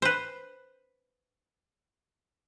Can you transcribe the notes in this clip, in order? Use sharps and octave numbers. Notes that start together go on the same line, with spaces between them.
B4 C5